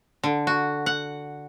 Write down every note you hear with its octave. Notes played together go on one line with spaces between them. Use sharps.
D3
F#4
F#5